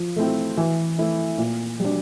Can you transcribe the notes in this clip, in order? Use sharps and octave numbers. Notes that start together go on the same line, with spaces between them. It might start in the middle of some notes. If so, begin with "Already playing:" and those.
Already playing: F3
A3 C4 E4
E3
A3 E4
A#2
G3 D4